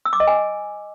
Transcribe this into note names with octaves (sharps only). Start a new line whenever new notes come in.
E6
D6
D#5
G#5